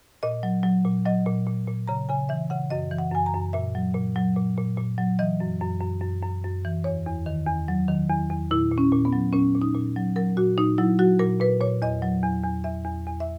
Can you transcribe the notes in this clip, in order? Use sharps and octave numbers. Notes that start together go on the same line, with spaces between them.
A#2 D#5
F#3
F#3
A#2
F#3 D#5
A#2
A#2
A#2
C#3 A#5
C#3 G#5
E3 E5
C#3 F#5
F#2 D#5
E3
F#5
F#2 G#5
A#5
F#2
A#2 E5
F#3
A#2
F#3
A#2
A#2
A#2
F#3
E3 D#5
F#2
F#2
F#2
F#2
F#2
F#2
E3
E2 C#5
E2
D#3
E2
F#3
D#3
E2
E2
A#2 E4
A#2
C#4
A#2
B3
F#3
A#2 C#4
A#2
D#4
A#2
F#3
F#3 A#4
A#2 F#4
A#2 D#4
F#3 E4
F#3 F#4
A#2 A#4
A#2 B4
A#2 C#5
E2 D#5
F#3
E2
E2
E2 E5
E2
E2
E5